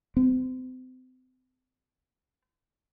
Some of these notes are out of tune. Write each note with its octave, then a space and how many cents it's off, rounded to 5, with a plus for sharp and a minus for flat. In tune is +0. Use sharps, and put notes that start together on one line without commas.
C4 -35